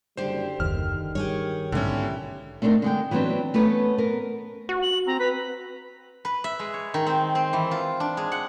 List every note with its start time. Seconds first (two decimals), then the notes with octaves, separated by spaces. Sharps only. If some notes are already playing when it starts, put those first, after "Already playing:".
0.17 F#1 D3 G3 D4 G4 C5
0.60 F#1 D#2 D#3 F6
1.15 G2 G4 G#4 C#5
1.72 B1 G#2 B2 D3 C#4 E4 G4
2.62 A3 C4 D4 D#4 A#4
2.82 D3 G#3 G5
3.11 E3 F#3 B3 C4 D4
3.54 A3 B3 C#4 B4
3.98 B3 A#4
4.69 F#4
4.82 F#7
5.07 C4 A#5
5.20 B4 B6
6.25 B4
6.44 E5
6.59 G#3
6.74 C#5
6.94 D#3
7.06 C4
7.35 C4
7.53 E3
7.71 F4
8.00 D4
8.17 G#3
8.32 F#5